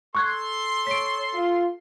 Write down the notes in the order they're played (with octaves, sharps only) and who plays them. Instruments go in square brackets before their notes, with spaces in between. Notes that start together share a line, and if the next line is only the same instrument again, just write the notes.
[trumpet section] A4 C6 [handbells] C#6 F#6 G#6
[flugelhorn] C#5 [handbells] B6 D7
[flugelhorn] F4